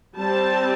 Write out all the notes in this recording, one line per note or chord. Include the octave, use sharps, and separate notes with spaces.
G3 C4 A5